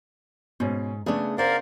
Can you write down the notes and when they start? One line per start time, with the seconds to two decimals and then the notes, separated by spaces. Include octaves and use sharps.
0.60 G#2 B2 C#4
1.06 C#3 A3 B3 D4 G#4
1.38 A#4 C5 D5 F5 F#5